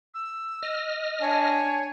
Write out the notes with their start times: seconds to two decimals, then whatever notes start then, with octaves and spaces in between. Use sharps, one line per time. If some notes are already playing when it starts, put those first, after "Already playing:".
0.14 E6
0.63 D#5 F6
1.21 D4 C#5 G#5